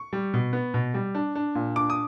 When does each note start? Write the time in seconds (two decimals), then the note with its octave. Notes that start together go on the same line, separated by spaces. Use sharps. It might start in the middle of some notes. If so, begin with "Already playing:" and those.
Already playing: C#6
0.13 G3
0.34 B2
0.53 B3
0.74 B2
0.94 G3
1.15 D4
1.35 D4
1.55 A#2
1.76 D4 D6
1.90 D#6